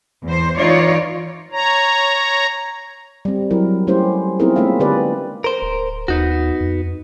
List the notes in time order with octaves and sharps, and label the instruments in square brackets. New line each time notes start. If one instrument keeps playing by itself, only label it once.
[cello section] E2 C5
E3 D#4 F4 C#5 D5
[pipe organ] C#5 A#5
[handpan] G3 C4
F#3 E4 A#4
G3 A3 C#4 E4 G4 C5
B3 C4 D#4 E4 G#4 A#4
G#3 A#3 C#4 F4 E5 F5
D3 G4 B4 D5
[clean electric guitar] A#4 C5
[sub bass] D1
[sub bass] D#2 [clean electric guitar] B3 D#4 F#4
[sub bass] F2